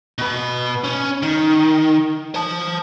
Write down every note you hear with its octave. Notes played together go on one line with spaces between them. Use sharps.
B2 B4
C#4
D#3
C5 A5